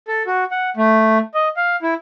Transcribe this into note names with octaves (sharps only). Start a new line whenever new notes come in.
A4
F#4
F#5
A3
D#5
F5
E4